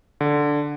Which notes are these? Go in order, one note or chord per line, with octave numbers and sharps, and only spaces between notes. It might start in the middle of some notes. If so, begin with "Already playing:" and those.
D3